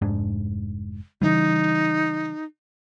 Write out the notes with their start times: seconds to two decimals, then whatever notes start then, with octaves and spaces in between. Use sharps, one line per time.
0.02 F1 G#2 D4
1.22 C#3 E3 G3 D#4